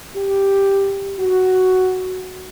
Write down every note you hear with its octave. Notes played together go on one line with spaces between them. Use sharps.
G4
F#4